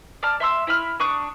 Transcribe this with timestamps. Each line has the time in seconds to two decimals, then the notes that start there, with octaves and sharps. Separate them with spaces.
0.23 D5 A5 F6
0.40 E5 C6 E6
0.67 E4 E5 B5 F6
1.00 D4 C#6 D#6 F#6